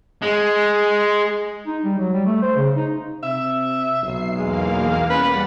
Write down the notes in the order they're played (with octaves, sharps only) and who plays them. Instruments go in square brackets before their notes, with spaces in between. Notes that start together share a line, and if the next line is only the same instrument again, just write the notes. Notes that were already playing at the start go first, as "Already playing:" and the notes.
[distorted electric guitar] G#3
[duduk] D#4
G3
F#3
G3
A3
C5
C#3
D#4
[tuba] C3 [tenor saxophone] E5
[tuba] B1 [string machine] C7
[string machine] E2 A#3 F5 [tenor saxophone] G#3
[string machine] G3 F#5 A6 [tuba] C#4 [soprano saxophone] B4